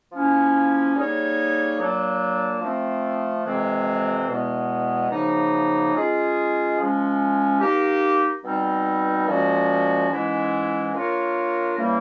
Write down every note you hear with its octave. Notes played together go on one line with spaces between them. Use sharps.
F3 A#3 C#4 E4
G3 A#3 D#4 G#4 C#5
A#2 F#3 A#3 D4
F3 A3 C4
F2 C3 E3 G#3 C4
E2 B2 G#3 B3
F#2 C#3 F3 A#3 D#4
G#3 C#4 F4 G#4
F3 G#3 C#4
A#3 D#4 G4
B2 G3 C4 D#4
A#2 F3 G#3 C#4 F#4
G#2 E3 G#3 C#4 E4
A#3 D4 F4 A#4 C#5
C#3 E3 G3 A#3